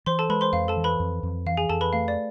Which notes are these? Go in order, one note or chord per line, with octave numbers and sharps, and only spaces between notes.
E3 C5 C6
A4 A5
G#3 B4 B5
C5 C6
F2 F5
A4 A5
E3
B4 B5
F2
F2
E3 F5
G#4 G#5
F2 A4 A5
B4 B5
A3 F5
D5